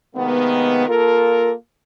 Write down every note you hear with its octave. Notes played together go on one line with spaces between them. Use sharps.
C3 D#3 G#3 A#3 B3
A#3 F4 A4 A#4